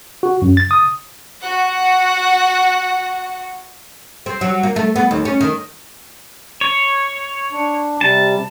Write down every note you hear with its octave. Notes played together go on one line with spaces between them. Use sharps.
F#4
F#2
A6
D#6
F#4 F#5
C4
F#3
A#3
A3
B3
D#2
C#4
D#3
C#5
D4
C3 G3 A5